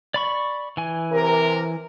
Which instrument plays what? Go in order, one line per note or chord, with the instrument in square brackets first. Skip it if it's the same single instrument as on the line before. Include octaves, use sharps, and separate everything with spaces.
[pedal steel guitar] D5 B5 C#6
E3 G#5
[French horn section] C3 A#4